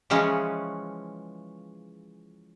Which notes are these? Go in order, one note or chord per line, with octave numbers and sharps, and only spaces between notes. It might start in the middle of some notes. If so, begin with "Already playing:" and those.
C#3 E3 F3 G#3 C#4 G#4